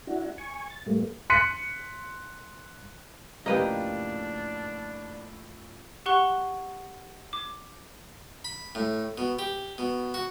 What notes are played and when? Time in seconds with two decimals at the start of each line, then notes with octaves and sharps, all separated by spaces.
0.07 D4 E4 F#4
0.38 G#5 C#6
0.70 A6
0.86 A2 G3 A3 A#3
1.30 C6 F#6 B6 C#7 D#7
3.46 F2 A2 C#3 A#3 D4 G4 B4 D#5
6.06 G4 F#5 C#6 F#6 G7
7.33 D6
8.44 B5
8.75 A2
9.18 B2
9.39 G4
9.78 B2
10.14 F#4